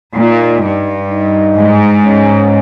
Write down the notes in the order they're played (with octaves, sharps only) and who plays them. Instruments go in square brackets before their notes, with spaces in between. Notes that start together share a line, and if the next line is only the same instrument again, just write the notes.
[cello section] A#2 [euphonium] D#4
[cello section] G2
[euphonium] D#4
[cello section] G#2
[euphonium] C#4